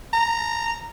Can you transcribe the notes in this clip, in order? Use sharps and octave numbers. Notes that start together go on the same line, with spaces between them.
A#5